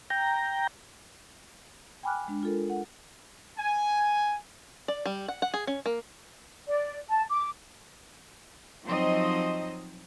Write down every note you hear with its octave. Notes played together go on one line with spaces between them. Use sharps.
G5 A#5
G5 G#5 B5 D6 F6 F#6
G#3 D4
F4 A4 A#4
F#5
G#5
D5
G3
F#5
F#5
G#4
C#4
A#3
D5
A5
D6
F3 F#3 C4 D#4 C5 D#5